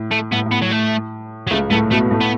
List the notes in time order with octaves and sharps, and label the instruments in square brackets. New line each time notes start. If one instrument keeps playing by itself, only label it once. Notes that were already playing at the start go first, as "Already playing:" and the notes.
Already playing: [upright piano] A2
[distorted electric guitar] A3
[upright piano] A2 [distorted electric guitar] B3
[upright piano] A2
[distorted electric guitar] B3
F#3
A3
F#3
[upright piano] C#2 C#3 [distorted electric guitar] A3
[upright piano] A2 A3 [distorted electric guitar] B3
[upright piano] B2 B3 [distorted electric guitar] A3
[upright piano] A2 A3
[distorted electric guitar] B3